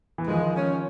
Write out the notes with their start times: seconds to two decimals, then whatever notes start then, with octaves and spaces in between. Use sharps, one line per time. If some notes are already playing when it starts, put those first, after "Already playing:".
0.18 E3
0.27 D#3 F3 G#3
0.55 C#4